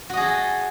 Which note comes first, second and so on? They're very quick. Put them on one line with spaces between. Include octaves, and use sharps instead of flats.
F#4 D#5 G#4 A4